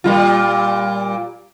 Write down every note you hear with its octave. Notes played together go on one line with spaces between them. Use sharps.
A#2 G3 F4